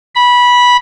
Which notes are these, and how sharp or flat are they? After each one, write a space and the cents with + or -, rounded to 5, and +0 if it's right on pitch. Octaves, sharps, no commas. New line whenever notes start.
B5 -15